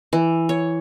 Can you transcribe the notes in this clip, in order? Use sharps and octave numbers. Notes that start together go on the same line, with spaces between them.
E3
C#5